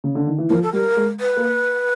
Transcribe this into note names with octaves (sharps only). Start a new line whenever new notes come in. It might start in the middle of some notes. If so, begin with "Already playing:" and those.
C#3
D3
D#3
E3
F3 A#4
A4
G3 A#4
G#3
B4
A#3